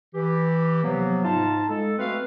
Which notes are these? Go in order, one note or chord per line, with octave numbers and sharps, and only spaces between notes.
E3 G4
C3 F3 F#3 A#3 B3
G#2 D#4 F4 A5
G#3 A4
G#3 A3 C4 F#4 B4 F5